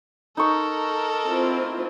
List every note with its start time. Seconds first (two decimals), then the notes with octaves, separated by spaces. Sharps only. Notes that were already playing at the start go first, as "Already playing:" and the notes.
0.37 D#4 A4 A#4 C#6
1.26 C4 E4 F4